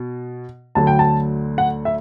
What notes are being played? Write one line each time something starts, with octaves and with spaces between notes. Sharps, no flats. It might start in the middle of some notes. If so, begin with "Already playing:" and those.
Already playing: B2
D2 D3 F#3 A5
G5
A5
F#5
E5